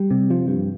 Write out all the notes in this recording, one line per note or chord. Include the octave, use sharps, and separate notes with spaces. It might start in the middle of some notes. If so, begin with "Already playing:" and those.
Already playing: G3
C3
F3
G2